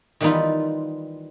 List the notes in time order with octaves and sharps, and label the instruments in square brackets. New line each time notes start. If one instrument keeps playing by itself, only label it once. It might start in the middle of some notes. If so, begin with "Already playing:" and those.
[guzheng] D#3 E3 G3 B3 D#4 F4